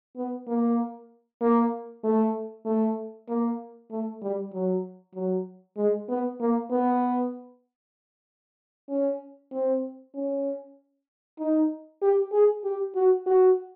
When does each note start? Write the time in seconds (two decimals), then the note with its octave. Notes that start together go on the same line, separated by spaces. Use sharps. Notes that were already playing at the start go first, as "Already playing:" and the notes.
0.16 B3
0.47 A#3
1.41 A#3
2.04 A3
2.66 A3
3.28 A#3
3.91 A3
4.22 G3
4.53 F#3
5.15 F#3
5.77 G#3
6.09 B3
6.41 A#3
6.71 B3
8.89 C#4
9.52 C4
10.14 C#4
11.39 D#4
12.02 G4
12.32 G#4
12.64 G4
12.95 F#4
13.26 F#4